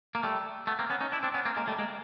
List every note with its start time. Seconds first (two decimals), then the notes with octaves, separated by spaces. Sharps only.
0.15 A#3
0.23 G3 A3
0.67 A3 B3
0.79 A#3 C4
0.90 B3 C#4
1.01 C#4 D#4
1.12 D4 E4
1.23 C4 D4
1.34 B3 C#4
1.45 A#3 C4
1.57 G#3 A#3
1.67 G3 A3
1.79 G#3 A#3